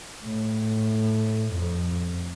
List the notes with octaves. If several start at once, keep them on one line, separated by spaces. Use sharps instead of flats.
A2
F2